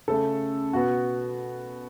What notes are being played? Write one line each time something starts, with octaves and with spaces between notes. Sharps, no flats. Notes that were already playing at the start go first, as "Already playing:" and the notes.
C#3 A3 A4
B2 B3 F#4